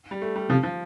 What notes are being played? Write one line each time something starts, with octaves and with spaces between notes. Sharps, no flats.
G3
A3
G3
C3 F3
F3